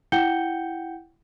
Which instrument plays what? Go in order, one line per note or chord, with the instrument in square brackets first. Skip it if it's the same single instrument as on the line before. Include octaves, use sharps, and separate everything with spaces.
[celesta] E4 F#5 G5 G6 C#7 G7